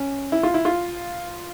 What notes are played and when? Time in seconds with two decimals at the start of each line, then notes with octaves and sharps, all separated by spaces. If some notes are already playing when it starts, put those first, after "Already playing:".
Already playing: C#4
0.32 E4
0.43 F4
0.54 E4
0.65 F4